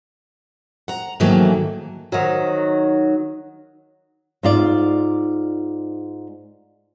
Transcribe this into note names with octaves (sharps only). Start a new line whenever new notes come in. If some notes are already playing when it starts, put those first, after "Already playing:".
F#5 A#5
G#2 D#3 E3 F#3 A3 A#3
D#3 F#3
G#2 F4 D5